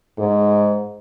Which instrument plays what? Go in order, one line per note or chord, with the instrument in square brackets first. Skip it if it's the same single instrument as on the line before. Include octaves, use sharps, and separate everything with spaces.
[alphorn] G#2